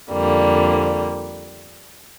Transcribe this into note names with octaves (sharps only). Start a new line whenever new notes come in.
F2 D3 G3 A#3